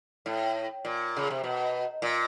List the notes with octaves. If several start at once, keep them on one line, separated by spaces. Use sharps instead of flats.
A2
A#2
C#3
C3
B2
A#2